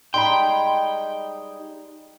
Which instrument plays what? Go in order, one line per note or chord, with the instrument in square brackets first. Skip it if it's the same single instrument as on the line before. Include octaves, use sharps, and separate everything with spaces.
[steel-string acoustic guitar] G3 G#3 D#4 [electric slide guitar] G5 [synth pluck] B5 C6